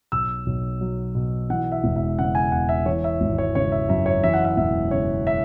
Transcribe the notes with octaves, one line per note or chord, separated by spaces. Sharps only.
B1 E6
B1
F#3
B2
E3 F#5
E5
E1
E5
C#3 F#5
G#5
E2 F#5
E5
E3 C#5
E5
G#1
C#5
C#3 C#5
E5
F#2 E5
C#5
E3 E5
F#5
E5
E1 E5
C#3 C#5
E5